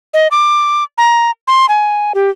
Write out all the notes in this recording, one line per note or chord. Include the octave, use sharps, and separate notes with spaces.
D#5
D6
A#5
C6
G#5
G4